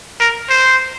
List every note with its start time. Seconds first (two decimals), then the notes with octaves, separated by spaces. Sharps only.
0.21 A#4
0.50 C5